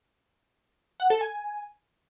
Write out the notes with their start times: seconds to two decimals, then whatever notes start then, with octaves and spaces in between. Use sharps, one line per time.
1.00 F#5
1.10 A4
1.21 G#5